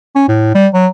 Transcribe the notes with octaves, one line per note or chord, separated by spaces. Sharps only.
C#4
A2
G3
F#3